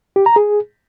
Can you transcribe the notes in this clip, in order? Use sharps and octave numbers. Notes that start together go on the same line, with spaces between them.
G4
A#5
G#4